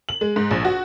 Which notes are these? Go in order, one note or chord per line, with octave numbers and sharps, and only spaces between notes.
F#7
G#3
G#2
A#1
F#4